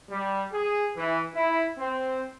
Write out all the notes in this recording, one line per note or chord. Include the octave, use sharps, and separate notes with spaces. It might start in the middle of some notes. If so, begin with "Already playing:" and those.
G3
G#4
E3
E4
C4